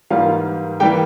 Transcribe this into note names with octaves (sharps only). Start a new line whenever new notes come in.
G#2 E3 G3 A#3 F4 F5
E3 G3 A#3 G4 G5